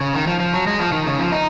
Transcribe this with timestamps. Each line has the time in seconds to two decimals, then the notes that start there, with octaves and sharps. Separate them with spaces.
0.01 C#3
0.14 D#3
0.27 F3
0.40 F3
0.54 F#3
0.67 G#3
0.80 F3
0.92 D#3
1.07 C#3
1.19 F3
1.32 D#4